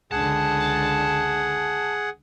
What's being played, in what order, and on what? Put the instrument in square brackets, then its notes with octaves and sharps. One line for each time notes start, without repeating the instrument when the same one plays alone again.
[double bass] C#2 D3 [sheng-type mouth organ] G#4 F#5 [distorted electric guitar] A5